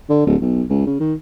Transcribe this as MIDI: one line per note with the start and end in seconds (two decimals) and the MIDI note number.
0.09 0.23 50
0.26 0.36 26
0.41 0.63 35
0.70 0.85 37
0.86 0.99 49
1.00 1.14 51